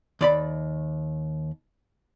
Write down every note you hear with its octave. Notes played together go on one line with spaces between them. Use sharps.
D#2 D5 B5